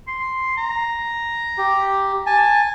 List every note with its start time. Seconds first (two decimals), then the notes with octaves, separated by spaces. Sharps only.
0.08 C6
0.57 A#5
1.58 G4
2.26 G#5 A5